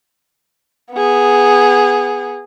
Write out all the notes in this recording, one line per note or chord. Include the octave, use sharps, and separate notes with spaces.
B3 G#4